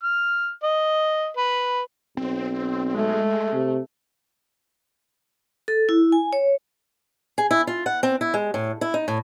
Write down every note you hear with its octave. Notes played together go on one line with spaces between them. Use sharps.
F6
D#5
B4
B1 C4
G#3 A3
C3
A4
E4
G#5
C#5
G#4
E4
F4
F#5
C4
E4
G#3
A2
E4
D#4
A2